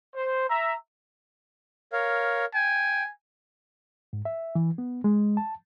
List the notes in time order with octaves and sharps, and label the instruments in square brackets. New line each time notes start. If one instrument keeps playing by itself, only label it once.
[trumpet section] C5
E5 A#5
[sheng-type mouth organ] A#4 C#5 F5
[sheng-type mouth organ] G5 [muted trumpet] G#5
[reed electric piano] G#2
E5
E3
B3
G#3
A5